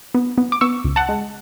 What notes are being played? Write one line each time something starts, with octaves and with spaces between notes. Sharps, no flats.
B3
B3
D6
B3 C#6 E6
C#2
F#5 A5
G#3